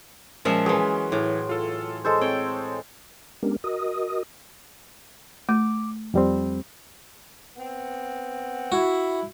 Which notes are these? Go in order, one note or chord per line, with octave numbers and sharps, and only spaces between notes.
A#2 F3 G#3 C#4 E5
E3 F#3 G#4 C6
A2 E3
F4 A4
G#3 A4 C5
C4 C#5 G5
G#3 B3 C#4 D4 G4 A#4
F#4 A#4 D#5 D#6
A3 D6
F2 G3 C4
B3 C4 F#5
E4 F#4